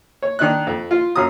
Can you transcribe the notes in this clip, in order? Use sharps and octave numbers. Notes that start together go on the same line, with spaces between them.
C#5
D#3 D4 F#6
F2
F4
F#2 F#3 F5 A#5 D#6